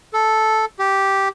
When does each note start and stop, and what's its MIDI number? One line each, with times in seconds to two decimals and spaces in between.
0.13 0.65 69
0.79 1.28 67